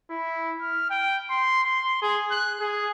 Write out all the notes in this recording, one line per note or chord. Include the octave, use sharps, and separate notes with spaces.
E4
F6
G5
C6
C6
G#4
F#6
G#4